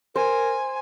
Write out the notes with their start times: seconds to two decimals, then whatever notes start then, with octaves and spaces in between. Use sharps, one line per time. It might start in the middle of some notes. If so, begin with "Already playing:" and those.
0.16 A#4 C5 G#5